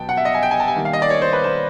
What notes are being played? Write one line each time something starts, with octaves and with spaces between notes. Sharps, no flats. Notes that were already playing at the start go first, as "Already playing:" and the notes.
Already playing: B2 F#3 B3 G5 A5
F#5
E5
D#5
G#5
G5
G#5
A5
G#5
D#3 G3 A#3
F5
D#5
D5
C#5
C5
B4
C5